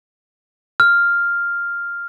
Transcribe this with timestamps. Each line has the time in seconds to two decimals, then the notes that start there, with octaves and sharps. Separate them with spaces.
0.80 F6